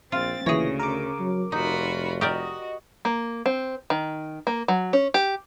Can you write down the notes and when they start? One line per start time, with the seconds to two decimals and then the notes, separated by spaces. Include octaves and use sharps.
0.12 A#1 C4 F4 A6
0.46 D2 A#2 C#3 E3 G#4 C#5 A#6
0.79 A#4 D6
1.20 F#3
1.52 F1 D#4 F4 F#4 B5
2.21 F#4 G4 A#4 D5 D#5
3.05 A#3
3.46 C4
3.90 D#3
4.47 A#3
4.68 F#3
4.93 C#4
5.14 G4